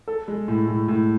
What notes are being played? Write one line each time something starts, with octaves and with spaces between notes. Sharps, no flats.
A4
G#3
A2
A2
A2